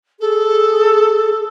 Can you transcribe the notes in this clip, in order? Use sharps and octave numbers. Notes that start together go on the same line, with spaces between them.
G#4 A4